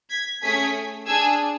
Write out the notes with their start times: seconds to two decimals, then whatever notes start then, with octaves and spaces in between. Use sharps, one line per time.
0.10 G#6 B6
0.42 A3 C#4 G#4 G#6 B6
1.06 D4 G#4 E6 G#6